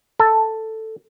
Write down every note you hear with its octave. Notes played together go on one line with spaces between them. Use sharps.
A4